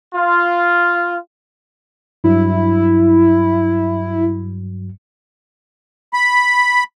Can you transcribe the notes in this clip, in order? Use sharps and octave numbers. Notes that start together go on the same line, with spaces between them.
F4
G2 F#3 E4
B5